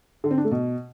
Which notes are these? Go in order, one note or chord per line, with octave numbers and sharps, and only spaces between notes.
D3
C4
D4
A3
B2